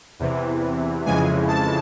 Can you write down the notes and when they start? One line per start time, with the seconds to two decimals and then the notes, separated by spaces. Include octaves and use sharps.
0.20 E2 C3 E3
1.06 F2 C#3 E3 G#3 G#5
1.48 A5